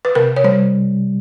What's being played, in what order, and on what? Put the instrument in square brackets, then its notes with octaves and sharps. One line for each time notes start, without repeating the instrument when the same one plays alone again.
[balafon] B4
[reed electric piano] C3 [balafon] A#4
[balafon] C#5
[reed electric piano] G3 [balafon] C5